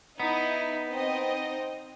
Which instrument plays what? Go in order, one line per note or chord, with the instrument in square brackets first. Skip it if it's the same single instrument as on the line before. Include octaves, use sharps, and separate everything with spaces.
[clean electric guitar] B3 [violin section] D#4 E4
[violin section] C4 D#4 D#5